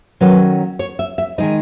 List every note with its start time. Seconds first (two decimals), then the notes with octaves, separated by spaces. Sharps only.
0.21 D#3 F#3 A3 C#4 B4
0.79 C#5
0.99 E5
1.18 E5
1.38 D#3 G#3 D#4 D#5